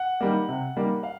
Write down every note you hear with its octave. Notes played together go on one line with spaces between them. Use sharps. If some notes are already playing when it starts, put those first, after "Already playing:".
Already playing: F#5
D#3 G3 A#3
C3
D#3 G3 A#3
F5